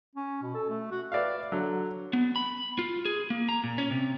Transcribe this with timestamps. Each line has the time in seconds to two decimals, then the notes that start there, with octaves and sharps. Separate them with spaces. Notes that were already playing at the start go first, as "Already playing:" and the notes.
0.16 C#4
0.42 B2
0.54 A4
0.69 A3
0.91 F#4
1.12 B4 D5 E5 F5
1.52 D3 F#3
2.13 B3
2.36 B5
2.79 F4
3.05 G#4
3.30 A#3
3.49 A#5
3.64 A#2
3.78 C#4
3.91 C3